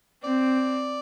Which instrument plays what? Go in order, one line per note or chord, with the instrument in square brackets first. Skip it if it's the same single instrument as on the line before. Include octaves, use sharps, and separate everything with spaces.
[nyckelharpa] C4 [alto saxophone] D5